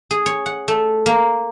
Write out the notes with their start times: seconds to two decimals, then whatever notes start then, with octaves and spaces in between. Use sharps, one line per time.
0.11 G#4
0.26 C#5
0.46 F#5
0.68 A3
1.06 A#3